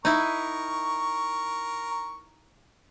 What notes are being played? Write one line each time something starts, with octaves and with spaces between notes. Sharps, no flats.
D#4 E4 A#4 C#6